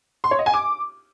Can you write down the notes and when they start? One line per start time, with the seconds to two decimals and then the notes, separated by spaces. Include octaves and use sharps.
0.24 C6
0.31 C#5
0.39 D#5
0.46 G#5
0.54 D6